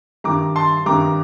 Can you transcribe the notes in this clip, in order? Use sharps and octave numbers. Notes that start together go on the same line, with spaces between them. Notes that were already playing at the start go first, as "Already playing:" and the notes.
G2 D#3 G3 A#5 D6
A5 C6
G2 D#3 G3 A#5 D6